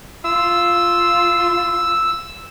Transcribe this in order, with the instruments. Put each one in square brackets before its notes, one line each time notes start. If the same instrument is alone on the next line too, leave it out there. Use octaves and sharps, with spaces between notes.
[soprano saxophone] F4 [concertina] E6